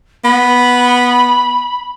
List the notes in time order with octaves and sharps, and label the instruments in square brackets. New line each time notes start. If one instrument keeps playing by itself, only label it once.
[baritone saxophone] B3 [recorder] B5